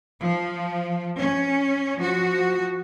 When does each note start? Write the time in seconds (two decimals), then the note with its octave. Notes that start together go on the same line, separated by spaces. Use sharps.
0.22 F3
1.18 C#4
1.97 F3 F#4